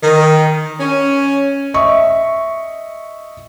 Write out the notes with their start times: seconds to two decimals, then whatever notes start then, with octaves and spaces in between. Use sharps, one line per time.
0.03 D#3
0.80 C#4
1.74 D#5 E5 C#6